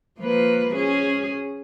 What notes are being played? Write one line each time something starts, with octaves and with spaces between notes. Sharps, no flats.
F3 A#3 B4
C#4 G#4